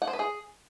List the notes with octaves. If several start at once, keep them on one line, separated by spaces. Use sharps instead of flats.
F#5
C5
B4
G#4